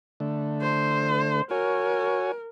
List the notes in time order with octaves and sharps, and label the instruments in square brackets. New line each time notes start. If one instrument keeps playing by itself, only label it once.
[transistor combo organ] D3 A3
[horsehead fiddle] C5
[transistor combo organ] F#4 C#5 G#5 [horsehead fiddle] A#4